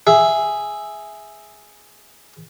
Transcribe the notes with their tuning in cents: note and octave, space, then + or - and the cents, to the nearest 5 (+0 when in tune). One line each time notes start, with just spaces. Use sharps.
G#4 +0 E5 +0